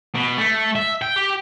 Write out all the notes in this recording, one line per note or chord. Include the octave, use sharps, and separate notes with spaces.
B2
A3
E5
G5
G4